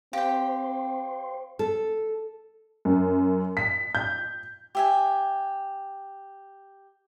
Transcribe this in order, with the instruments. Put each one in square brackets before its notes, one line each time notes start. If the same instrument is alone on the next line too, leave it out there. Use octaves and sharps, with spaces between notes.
[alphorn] C4 [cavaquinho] G4 G5 [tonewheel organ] C5 [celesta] F5
[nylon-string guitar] A4
[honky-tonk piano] F#2
B6
G6
[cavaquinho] G4 E5 G#5